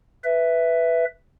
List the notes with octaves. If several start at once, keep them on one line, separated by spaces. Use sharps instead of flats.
B4 E5